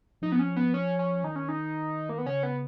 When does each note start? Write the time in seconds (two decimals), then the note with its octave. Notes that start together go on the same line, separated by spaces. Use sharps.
0.22 F3 D#4
0.32 B3
0.39 C#4
0.56 B3
0.74 C#4
0.99 C#4
1.24 D#3 D#4
1.36 C#4
1.49 D#4
2.09 A#3
2.18 B3
2.26 C#3 C#4
2.43 B3